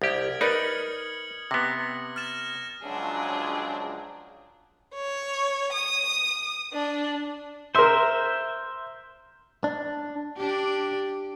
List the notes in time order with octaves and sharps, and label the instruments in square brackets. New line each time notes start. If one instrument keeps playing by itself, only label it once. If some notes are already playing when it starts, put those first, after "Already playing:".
[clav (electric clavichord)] C2 G4 [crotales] D#6 F6 G#6
[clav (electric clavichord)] D#4 [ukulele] A#4 B4 D5 [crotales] D#6 C#7 F#7
[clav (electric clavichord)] C3 B3 [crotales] A#6
[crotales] F6 A6 E7
[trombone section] C#2 F3 F#3 [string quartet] D4 G#4
[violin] C#5
D#6
D4
[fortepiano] A#4 C6 [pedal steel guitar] C5 E5
[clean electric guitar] D4
[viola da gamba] D4 G4